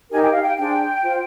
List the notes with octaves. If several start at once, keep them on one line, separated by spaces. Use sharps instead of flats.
D#4 G4 A#4 G#5
G5
F5
G5
D4 G#4 C5 G5
F4 C5